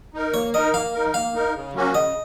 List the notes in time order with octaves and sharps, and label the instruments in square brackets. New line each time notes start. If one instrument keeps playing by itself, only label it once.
[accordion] D#4 A#4
[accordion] A#3 [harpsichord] C#5
[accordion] D#4 A#4 [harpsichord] D#5
[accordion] A#3 [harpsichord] F5
[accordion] D#4 A#4
[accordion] A#3 [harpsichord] F5
[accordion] D#4 A#4
C#3
F#3 A#3 C#4 F#4
[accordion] C#3 [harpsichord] D#5